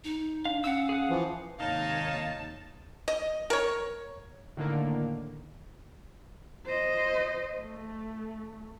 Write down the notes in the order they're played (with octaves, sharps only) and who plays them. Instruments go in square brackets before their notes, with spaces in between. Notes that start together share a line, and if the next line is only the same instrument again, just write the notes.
[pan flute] D#4
[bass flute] D4 [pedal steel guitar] F5
[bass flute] C#4 [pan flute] F5 [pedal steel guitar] F#5 E6
[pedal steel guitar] G#4 F#5
[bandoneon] E3 F3
[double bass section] D#2 G#2 C3 [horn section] D#4 [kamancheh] C#5 F5 [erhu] A5
[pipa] D#5
A#4 C#5
[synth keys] A2 D3 D#3 A#3
[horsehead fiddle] C5 D#5
A3